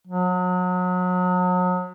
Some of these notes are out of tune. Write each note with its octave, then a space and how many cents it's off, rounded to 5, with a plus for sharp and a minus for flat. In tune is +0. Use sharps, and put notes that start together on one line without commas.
F#3 -35